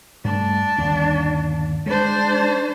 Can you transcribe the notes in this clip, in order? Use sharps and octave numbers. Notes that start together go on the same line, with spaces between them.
G2 A3 D4
G1 D#2
G#3 D4 C5